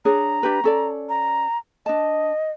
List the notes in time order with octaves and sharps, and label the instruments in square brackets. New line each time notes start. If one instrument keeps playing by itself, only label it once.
[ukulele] D4 G#4 C#5 [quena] A#5
[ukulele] D4 G4 B4
C#4 A4 D5
[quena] A#5
[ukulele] D4 A5 [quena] D#5